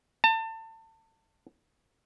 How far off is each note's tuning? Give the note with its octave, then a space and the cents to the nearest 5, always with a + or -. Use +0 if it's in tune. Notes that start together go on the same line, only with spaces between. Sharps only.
A5 +30